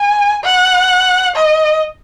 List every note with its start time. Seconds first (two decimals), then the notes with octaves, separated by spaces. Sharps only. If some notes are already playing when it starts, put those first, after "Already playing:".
Already playing: G#5
0.44 F#5
1.35 D#5